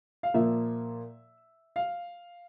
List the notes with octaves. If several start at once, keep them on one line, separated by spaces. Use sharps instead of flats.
F5
A#2 F3 A#3 E5
F5